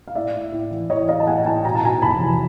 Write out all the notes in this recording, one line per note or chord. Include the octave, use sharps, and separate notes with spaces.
F5
A2 D5 E5
A2
A2
E3
E3 C#5 D#5
A2 D#5 F5
A5
A2 F#5 G#5
A2 G5 A5
B2 A#5
A5
B2 G#5 A#5
F1 A5 B5
E2